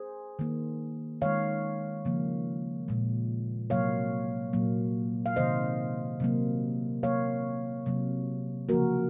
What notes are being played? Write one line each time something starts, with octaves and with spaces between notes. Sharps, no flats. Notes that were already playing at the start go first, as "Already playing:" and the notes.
Already playing: G#4 C5
D#3 A#3
D#3 G#3 C#5 F5
C#3 F3 A#3
A#2 G#3
C3 F#3 A#3 C#5 F5
A#2 F#3 A#3
F5
C3 D#3 A#3 C5 D#5
C3 F#3 A#3
C3 F#3 A#3 C#5 F5
C3 F#3 A#3
C#3 F3 A#3 F#4 A#4